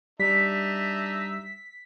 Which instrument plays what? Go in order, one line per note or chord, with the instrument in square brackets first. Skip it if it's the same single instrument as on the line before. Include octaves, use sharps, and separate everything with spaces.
[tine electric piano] G3 [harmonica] D4 D#4 E5 [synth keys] B6